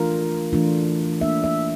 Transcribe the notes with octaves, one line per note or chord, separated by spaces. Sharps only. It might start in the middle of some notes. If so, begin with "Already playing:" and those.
Already playing: E3 A3 D4 F4 A#4
E3 A3 D4 F4
E3 A#3 D4 E5
E5